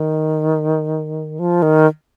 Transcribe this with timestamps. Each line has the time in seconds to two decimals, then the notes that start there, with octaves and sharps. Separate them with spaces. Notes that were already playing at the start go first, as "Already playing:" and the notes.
Already playing: D#3
1.39 F3
1.62 D#3